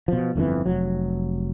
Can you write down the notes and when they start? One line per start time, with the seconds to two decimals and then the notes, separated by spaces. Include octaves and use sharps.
0.08 B2 F3
0.36 G1 F2 D3 E3
0.66 F1 F#3